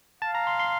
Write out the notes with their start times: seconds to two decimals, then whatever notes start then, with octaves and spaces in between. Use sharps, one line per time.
0.22 F5 A5
0.35 A#5
0.47 C6
0.59 C6